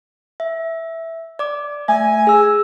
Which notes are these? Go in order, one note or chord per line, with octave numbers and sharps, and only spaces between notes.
E5
D5 D6
A3 E5 G#5
G#4 E6